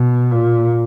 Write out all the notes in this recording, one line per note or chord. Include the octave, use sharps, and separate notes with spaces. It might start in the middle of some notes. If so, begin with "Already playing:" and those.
Already playing: B2
A#2